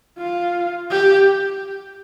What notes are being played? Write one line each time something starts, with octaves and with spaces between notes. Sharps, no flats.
F4
G4